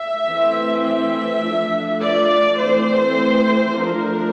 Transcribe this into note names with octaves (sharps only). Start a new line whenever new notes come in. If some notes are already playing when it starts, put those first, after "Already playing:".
Already playing: E5
E3 A3 C4
E5
F3 A3 D4
D5
E3 A3 C4 C5
F3 A3 D4 A#4